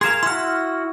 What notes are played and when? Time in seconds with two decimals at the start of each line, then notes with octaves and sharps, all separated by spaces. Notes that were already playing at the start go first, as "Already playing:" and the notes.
0.01 G#4 A#4 F5 C6 G#6 E7
0.23 E4 F#4 C6 F6